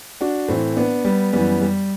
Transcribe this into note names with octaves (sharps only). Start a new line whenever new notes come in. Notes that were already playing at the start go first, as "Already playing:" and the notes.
D4 F#4
A2 E3 A3 C4
B3 D4
G3 B3
F#2 E3 G3 B3
G3